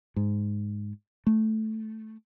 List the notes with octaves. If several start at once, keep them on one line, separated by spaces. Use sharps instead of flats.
G#2
A3